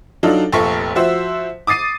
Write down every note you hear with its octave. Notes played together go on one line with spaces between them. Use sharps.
F#3 D4 D#4 F4 A4
F1 A#1 F4 A4 C#6 B6
F3 F#4 C5 E5
D6 D#6 A6 C7 D#7